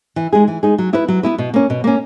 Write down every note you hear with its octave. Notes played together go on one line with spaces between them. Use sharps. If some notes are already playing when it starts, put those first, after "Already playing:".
E3
G#3 D#4 G#4
E3
G#3 D#4 G#4
F#3
B3 E4 B4
F#3
B3 E4 B4
B2
A#3 C#4
B2
A#3 C#4